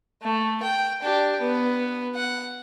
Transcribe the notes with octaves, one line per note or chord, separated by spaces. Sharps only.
A3
G5
D4 G4
B3
F#5